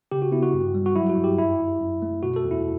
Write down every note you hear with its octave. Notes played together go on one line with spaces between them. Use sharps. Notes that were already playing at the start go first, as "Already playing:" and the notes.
C#3 G4
F#4
B3 E4
F#4
G2
G3
F#4
F#3 E4
F#4
G2
G4
F#2 E4
G1
F#2
A3
B2 F#4
A4
E2
E4